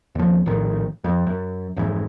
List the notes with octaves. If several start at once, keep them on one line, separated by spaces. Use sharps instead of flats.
D#2 F3
A#1 A2 D#3
F2
F#2
F1 G#2 E3